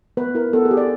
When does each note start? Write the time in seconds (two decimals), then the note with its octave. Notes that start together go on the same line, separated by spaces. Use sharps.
0.17 B3 B4
0.35 E4 A#4
0.53 B3 A4
0.65 G#4
0.71 G4
0.77 D5